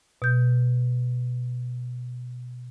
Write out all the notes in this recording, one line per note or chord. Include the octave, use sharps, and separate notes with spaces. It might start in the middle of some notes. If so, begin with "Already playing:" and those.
B2 G6